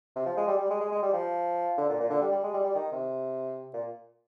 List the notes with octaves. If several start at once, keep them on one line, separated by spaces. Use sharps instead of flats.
C3
F3
G#3
G3
G3
G#3
G#3
G#3
G3
F3
D3
A#2
A#2
D3
G3
G3
G#3
G3
G3
D#3
C3
A#2